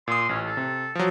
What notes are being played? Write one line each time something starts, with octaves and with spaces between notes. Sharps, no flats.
A#2 C6 D#6
A1 C#4
A4
C3
F3 F#3